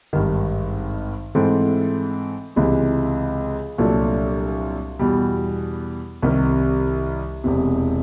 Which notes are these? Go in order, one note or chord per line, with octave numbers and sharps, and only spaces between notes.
G#1 G2 D#3
G#2 E3 A3 C4
C#2 C3 E3 G#3
C2 A#2 F#3 A3 D4
E2 B2 G3
C2 C3 D#3
E1 E2 C3